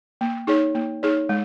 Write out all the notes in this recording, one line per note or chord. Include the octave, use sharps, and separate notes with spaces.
A#3
D#4 G#4 C#5
A#3
D#4 G#4 C#5
G#3